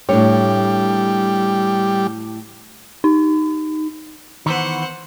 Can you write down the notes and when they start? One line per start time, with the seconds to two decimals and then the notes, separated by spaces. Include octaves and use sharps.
0.09 A2 G3 D4 C#5
3.04 D#4
4.46 D#3 E3 B3 C5 F#5